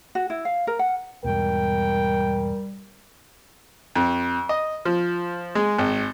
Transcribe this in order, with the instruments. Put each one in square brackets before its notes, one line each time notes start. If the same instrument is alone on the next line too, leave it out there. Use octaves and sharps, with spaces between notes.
[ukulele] F#4
E4
F5
A#4
F#5
[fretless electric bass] E2 G#2 B2 [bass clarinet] G3 [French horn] A#4 [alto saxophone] G5
[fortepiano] F2
D#5
F3
G#3
G#1